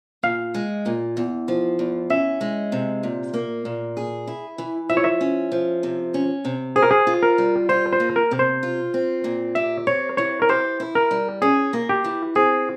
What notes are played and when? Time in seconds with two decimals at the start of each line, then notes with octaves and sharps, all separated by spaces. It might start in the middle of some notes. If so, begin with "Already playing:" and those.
0.23 A#2 F5
0.55 G#3
0.86 A#2
1.17 E2
1.48 F3
1.79 E2
2.10 C#4 E5
2.41 G#3
2.72 C3
3.03 A#2
3.34 A#3
3.65 A#2
3.97 G#4
4.27 E4
4.58 E3
4.89 F3 E5
4.97 C#5
5.04 E5
5.21 C#4
5.52 F3
5.83 C3
6.14 C#4
6.45 C3
6.76 G#4 C5
6.83 A#4
6.91 G#4
7.07 F4
7.23 A#4
7.38 G3
7.69 F4 C5
7.93 C5
8.00 A#3
8.16 A#4
8.31 C3
8.39 C5
8.63 F4
8.94 C4
9.24 A#2
9.55 G4 E5
9.87 C4 C#5
10.17 E3 C#5
10.42 A#4
10.49 G4 C5
10.80 E4
10.95 A#4
11.11 G3
11.42 C#4 G#4
11.73 A#3
11.89 G4
12.04 E3
12.35 C4 G#4